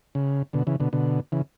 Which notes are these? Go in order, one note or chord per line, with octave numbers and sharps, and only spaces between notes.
C#3
B2 D3
C#3 E3
B2 D3
B2 D3
C#3 E3